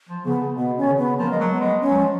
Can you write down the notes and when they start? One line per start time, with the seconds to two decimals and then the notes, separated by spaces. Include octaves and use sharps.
0.09 F3
0.25 C#3 B3
0.40 C#3
0.56 B2 B3
0.77 D#3 C#4
0.88 C#3
0.98 B3
1.19 F3 A#3
1.31 G#3
1.40 F#3
1.50 B3
1.60 G#3
1.81 C#4
1.90 F#3
1.97 F3